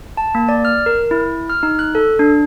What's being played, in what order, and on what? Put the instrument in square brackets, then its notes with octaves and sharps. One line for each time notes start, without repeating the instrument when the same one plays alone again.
[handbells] A5
A#3
D5
F6
A#4
E4
F6
D#4
F#6
A4
D4